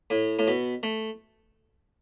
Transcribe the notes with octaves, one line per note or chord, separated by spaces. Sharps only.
A2
A2
B2
A3